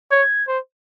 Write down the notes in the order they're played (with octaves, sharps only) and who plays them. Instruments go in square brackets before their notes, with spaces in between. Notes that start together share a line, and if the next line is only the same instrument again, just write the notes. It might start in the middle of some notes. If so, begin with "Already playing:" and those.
[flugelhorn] C#5 [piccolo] G#6
[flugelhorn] C5